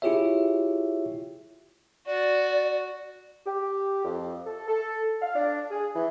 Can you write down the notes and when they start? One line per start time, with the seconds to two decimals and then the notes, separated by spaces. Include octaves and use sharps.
0.02 E4 F4 G4 G#4 C#5 E5
2.07 F#4 D5
3.45 G4
4.04 F2
4.45 A4
4.67 A4
5.21 F5
5.35 D4
5.70 G#4
5.95 E3